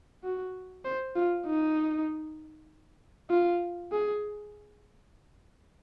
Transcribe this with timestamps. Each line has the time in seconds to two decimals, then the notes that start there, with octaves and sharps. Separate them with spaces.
0.24 F#4
0.85 C5
1.16 F4
1.47 D#4
3.30 F4
3.92 G#4